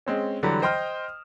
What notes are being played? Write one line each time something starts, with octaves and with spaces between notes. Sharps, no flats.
G#3 C4 C#4
D3 E3 F#3 G3
C5 D#5 G5 C6 D#6 F6